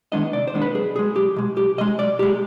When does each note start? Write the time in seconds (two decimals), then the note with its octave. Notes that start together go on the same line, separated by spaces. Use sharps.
0.12 D#3 G#3 B3 D4 D#5
0.33 C3 D5
0.47 C5
0.54 D#3 G#3 B3 D4
0.62 B4
0.74 B1 G#4
0.95 B2 G#3 G#4
1.15 B1 G4
1.36 B2 G#3
1.57 B1 G4
1.78 B2 G#3 D#5
1.99 B1 D5
2.19 B2 G#3 G4